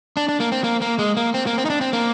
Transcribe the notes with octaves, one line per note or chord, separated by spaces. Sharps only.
D4
D4
A#3
C4
A#3
A#3
G#3
A#3
C4
A#3
C4
D#4
D4
C4
A#3